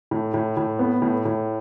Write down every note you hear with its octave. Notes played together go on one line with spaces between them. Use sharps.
A2
A2
A2
B3
A2
A2